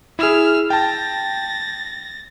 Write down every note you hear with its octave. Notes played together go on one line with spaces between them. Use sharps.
E4 G#4 E6 F6
G5 A5 A6 A#6